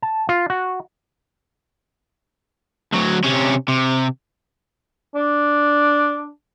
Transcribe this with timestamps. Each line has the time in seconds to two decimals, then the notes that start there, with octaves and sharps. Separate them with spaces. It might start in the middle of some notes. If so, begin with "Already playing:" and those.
0.02 A5
0.29 F4
0.50 F#4
2.93 D2 F#3
3.24 C3 C#4
3.68 C3
5.15 D4